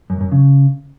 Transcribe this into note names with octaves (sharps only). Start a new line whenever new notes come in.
F#2
F#2
C#3